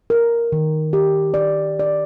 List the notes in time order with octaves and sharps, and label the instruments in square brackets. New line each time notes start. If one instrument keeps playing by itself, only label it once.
[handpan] A#4
D#3
G4
D5
D5